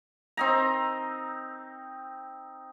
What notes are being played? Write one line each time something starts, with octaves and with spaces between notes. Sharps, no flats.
C4 D#4 A#5